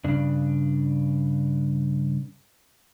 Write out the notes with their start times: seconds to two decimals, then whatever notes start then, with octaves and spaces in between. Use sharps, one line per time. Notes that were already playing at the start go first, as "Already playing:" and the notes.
0.04 G2 C#3 D4